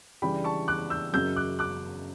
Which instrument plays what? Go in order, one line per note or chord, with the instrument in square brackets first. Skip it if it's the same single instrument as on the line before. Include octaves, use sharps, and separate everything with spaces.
[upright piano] C#3 E3 G3 D4 [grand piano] G5 B5
[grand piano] A5 C#6
D6 F#6
E6 G6
[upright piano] F#1 F#2 C#3 F#3 [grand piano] E6 G6
[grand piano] D6 F#6
D6 F#6